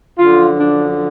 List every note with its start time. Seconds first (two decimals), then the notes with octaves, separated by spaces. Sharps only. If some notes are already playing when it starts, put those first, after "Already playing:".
0.19 F#2 D3 F3 F4
0.60 D4